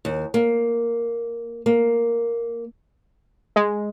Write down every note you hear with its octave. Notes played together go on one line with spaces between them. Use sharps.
D#2
A#3
A#3
G#3